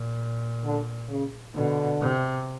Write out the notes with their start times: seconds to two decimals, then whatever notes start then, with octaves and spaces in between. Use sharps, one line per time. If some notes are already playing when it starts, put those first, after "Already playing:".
Already playing: A#2
0.64 D3
1.09 C#3
1.55 B2 D3
2.01 C3